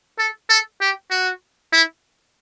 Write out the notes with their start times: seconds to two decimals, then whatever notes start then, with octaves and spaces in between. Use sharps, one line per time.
0.19 A4
0.49 A4
0.81 G4
1.11 F#4
1.73 E4